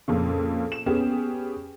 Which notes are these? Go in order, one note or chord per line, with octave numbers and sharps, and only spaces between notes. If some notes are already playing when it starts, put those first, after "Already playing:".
F2 A#2 C#3
E7
B3 C#4 G4 G#4